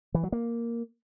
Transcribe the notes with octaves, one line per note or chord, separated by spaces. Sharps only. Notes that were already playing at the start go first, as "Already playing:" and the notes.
E3
F#3
A#3